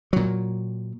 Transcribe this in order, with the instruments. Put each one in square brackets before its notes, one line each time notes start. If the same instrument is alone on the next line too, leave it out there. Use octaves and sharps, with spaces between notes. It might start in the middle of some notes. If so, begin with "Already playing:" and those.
[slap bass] A#2 F#3